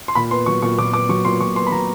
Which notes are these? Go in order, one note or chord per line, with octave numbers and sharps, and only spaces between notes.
C6
A#2 B5
B3 C6
F#3 C#6
A#2 C#6
A#2 D6
B3 D6
F#3 C#6
A#2 C6
A#2 C#6
B3 C6
B5
F#3 A#5